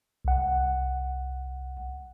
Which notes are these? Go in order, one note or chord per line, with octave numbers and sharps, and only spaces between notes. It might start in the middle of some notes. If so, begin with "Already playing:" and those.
C2 F#5